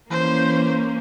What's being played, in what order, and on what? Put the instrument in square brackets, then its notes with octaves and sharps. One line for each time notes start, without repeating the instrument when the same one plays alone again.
[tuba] E3 [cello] A#3 C#4 [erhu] C5